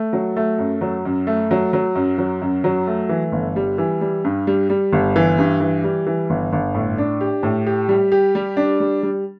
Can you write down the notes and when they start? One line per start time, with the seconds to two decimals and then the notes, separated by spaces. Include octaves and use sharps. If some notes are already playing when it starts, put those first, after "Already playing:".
Already playing: A3
0.13 F#3
0.37 A3
0.58 F#2
0.81 F#3
1.05 F#2
1.27 A3
1.51 F#3
1.73 F#3
1.95 F#2
2.18 F#3
2.42 F#2
2.64 F#3
2.87 A3
3.09 E3
3.32 G1
3.56 G3
3.78 E3
4.01 G3
4.25 G2
4.47 G3
4.70 G3
4.93 G1
5.16 E3
5.39 G2
5.60 E3
5.84 G3
6.07 E3
6.30 G1
6.53 G1
6.75 A2
6.98 D4
7.21 G4
7.43 A2
7.67 G4
7.89 G3
8.12 G4
8.35 G3
8.57 D4
8.80 G3
9.03 G3